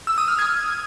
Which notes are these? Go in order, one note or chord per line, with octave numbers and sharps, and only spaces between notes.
E6
D#6
F6
G#6